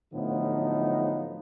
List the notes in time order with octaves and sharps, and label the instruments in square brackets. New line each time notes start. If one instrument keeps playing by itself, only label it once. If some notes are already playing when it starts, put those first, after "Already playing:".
[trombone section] A2 D3 F3 F#3 B3 D#4